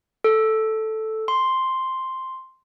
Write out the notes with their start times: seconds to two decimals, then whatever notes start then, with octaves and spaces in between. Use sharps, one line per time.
0.24 A4
1.28 C6